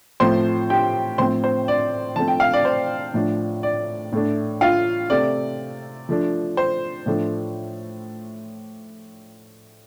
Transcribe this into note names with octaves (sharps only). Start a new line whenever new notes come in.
A2 F3 A3 C4 C5 C6
G4 G5
A2 F3 C4 C5 C6
C5
D5
F3 A3 C4 A5
G5
F5
D5
C5
A2 F3 D4
D5
A2 A3 D4
F4 F5
C3 A3 C4 D5
F3 A3 D4
C5
A2 F3 A3 D4